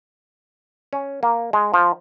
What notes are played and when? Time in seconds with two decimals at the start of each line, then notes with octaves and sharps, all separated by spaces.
0.93 C#4
1.23 A#3
1.53 G#3
1.74 F3